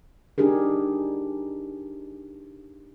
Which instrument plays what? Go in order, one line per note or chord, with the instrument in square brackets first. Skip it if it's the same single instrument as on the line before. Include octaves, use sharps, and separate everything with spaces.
[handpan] D4 D#4 G4 G#4 A#4